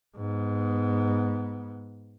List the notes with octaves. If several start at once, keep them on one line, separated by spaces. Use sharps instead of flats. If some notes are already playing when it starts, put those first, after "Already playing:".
G#2 B3